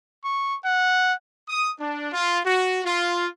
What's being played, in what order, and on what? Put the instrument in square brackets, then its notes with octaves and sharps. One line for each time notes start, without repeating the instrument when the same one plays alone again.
[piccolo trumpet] C#6
F#5
[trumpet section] D#6
D4
F4
F#4
F4